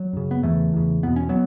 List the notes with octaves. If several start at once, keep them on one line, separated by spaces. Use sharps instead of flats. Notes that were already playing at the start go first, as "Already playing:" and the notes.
Already playing: F#3
F#2 C#3
B3
E2 C#3 E3 A3
E2 C#3
E2 B2 B3
C#4
F#3 B3